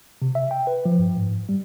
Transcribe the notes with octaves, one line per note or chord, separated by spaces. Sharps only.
C3
E5
G5
B4
F3
G2
G#2
G3